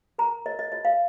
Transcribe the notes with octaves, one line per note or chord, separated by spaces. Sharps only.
A#4 A#5
A#4 D#5
D#5
F4 D#5
F5